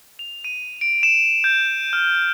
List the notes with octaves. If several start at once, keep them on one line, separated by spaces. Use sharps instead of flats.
F7
D#7
D7
E7
G6
F6